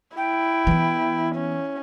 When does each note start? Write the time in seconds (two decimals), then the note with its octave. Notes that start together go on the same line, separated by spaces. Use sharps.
0.17 E4 G5
0.67 E3 B3
1.35 C#4